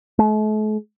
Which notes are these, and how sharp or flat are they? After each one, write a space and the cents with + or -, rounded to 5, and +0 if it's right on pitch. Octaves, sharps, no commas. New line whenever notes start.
A3 -45